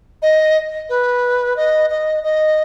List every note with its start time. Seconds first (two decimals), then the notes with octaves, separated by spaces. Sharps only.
0.22 D#5
0.89 B4
1.56 D#5
1.90 D#5
2.23 D#5